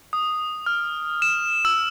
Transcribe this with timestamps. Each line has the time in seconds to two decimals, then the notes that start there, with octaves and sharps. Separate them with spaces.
0.13 D#6
0.66 F6
1.22 E7
1.65 E6